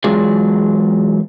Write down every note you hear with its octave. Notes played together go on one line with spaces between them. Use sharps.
E2 F#3 G#3 F4 G#4 D5